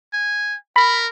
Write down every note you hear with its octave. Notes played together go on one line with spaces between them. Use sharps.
G#5
A#4 B5